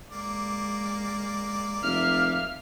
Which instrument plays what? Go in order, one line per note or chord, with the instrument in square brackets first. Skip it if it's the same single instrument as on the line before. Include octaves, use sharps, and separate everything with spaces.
[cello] G#3 [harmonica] A#3 D5
[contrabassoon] F1 [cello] E5 F5 [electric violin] F6